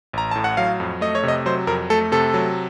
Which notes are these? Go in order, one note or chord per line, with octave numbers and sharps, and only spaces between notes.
A1 A#5
A2 A5
F#5
F#3 F5
F2
A3 D#5
C#5
C3 D#5
F#3 C5
F2 A#4
A3 A4
C3 A4
F#3